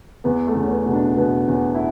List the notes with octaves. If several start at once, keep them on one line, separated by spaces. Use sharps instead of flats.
E2 B3
A3
E2
C#4
B3
B2
D4
B2 B3
E2 C#4
E4